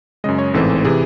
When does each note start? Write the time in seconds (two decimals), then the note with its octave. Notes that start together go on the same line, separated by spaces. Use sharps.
0.24 F#2 C#3 G#3 D#5
0.38 C#5
0.54 A1 G#2 E3 C4 A4
0.85 C3 E3 G#4